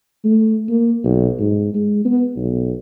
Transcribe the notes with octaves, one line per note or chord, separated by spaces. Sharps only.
A3
A#3
B1
G#2
G#3
B3
B1